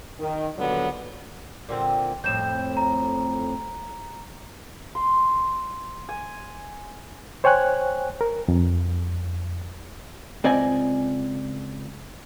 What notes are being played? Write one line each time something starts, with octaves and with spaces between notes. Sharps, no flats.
D#3
A#2 D3 F#3 G3 B3
A#2 D3 C4
F2 A2 G6 E7
A#5
C6
G#5
C5 C#5 G5 G#5 F#6
A#4
F2
C#2 C4 D5 D#5 G#5